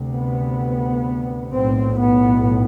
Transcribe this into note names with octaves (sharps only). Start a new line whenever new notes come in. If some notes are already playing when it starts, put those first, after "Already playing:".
Already playing: D2 C3
B3
B1 A2 C4
B3